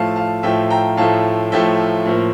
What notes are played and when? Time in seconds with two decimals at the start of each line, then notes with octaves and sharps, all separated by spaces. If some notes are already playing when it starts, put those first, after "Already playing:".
Already playing: A2 F3 A3 F5 A5
0.16 F5 A5
0.43 A2 F3 A3 E5 G5
0.70 G5 A#5
0.97 A2 F3 A3 F5 A5
1.52 A2 F3 A3 E5 G5
2.05 A2 F3 A#3